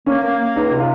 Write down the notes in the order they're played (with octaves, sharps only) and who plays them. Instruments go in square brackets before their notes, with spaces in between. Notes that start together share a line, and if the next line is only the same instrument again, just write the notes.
[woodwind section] A#3 [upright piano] C#4
[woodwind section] A#3
A#3
[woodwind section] C#2 [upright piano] D#4
[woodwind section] C3
[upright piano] F4